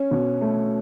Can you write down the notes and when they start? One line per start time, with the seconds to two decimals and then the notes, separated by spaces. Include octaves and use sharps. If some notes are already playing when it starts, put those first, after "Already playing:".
Already playing: C#4
0.11 B2
0.41 A3